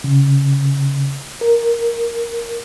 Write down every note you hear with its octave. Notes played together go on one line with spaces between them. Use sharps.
C#3
A#4